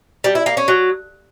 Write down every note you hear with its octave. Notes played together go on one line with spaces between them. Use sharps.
G3
E4
A#3
C#4
F#3